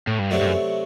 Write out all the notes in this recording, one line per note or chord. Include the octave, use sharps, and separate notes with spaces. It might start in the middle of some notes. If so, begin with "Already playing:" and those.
A2
G2
F#2 C3 F#3 A3 D4
G2
F#2